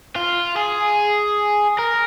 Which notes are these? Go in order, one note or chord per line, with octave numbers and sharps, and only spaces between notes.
F4
G#4
A#4